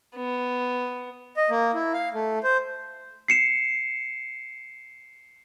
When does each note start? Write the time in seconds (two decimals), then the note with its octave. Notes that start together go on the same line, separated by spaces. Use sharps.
0.16 B3
1.37 D#5
1.50 A#3
1.74 E4
1.94 F5
2.14 A3
2.43 C5
3.28 C7 C#7 E7